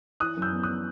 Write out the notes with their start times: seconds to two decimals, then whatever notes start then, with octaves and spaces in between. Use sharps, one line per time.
0.20 E3 D#6 F#6
0.37 F#2
0.42 E6 G6
0.52 B3
0.63 D#6 F#6
0.69 B3